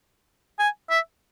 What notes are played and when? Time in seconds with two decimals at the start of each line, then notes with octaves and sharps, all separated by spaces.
0.59 G#5
0.90 E5